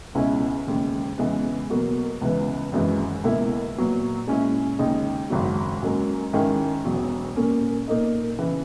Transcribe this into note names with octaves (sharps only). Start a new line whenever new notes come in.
C#2 B2 G#3 C#4 E4
E1 D#2 C#3 G#3
E2 C#3 E3 G#3 B3
E2 B2 F#3 A#3
C#2 C#3 E3 B3
G#1 F#2 E3 G#3
C#2 B2 A#3 E4
A#2 F#3 B3
A#2 G#3 C#4 E4
D#2 C#3 G#3 D#4
G#1 F#2 C#3 F#3
G#2 F#3 A#3 C#4
G#2 D#3 G#3 C#4 E4
E1 E2 B2 F#3
A#2 A#3 C#4
A#2 A#3 D#4
C#3 E3